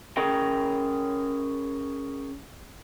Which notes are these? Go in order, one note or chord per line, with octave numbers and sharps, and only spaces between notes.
C#4 G#4 A#4 G5